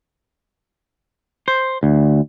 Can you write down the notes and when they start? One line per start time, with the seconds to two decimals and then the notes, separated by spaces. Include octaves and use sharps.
1.48 C5
1.83 D2